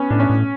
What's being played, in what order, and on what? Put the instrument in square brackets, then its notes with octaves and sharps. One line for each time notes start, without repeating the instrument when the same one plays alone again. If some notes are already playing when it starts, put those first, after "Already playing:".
Already playing: [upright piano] B3 C#4
[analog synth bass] A2 [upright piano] D4
[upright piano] C#4
[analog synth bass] A2